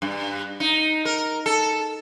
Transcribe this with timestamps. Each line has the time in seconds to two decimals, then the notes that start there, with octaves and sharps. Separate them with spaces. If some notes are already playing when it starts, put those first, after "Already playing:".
0.02 G2
0.60 D#4
1.05 A#4
1.46 A4